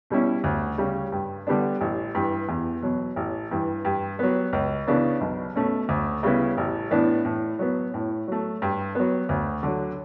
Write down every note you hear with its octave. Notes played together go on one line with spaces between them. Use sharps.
B2 G3 C#4 E4
D2
C#3 G3
G2
D3 G3 B3 D4
A1
G2 E3
E2
B2 F#3
A1
G2 E3
G2
F#3 B3
C#2
C#3 E3 B3 D4
B1
B2 A3 C#4
D2
C#3 G3 B3 E4
A1
A2 E3 B3 D4
A2
F#3 B3
A2
F#3 A3
G2
F#3 B3
D2
D3 F#3